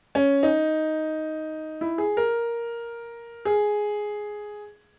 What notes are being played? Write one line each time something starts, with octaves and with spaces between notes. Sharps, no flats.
C#4
D#4
E4
G#4
A#4
G#4